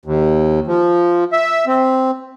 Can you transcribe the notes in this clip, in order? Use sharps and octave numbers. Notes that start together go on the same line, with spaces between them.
D#2
F3
E5
C4